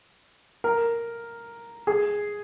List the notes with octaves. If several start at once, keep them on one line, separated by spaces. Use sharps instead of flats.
A#4
G#4